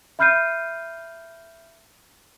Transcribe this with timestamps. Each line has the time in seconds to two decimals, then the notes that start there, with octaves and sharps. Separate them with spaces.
0.19 E5 B5 F6 G6 C7 D#7